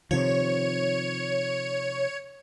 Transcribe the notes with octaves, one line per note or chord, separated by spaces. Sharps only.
C3 D#3 F3 C#5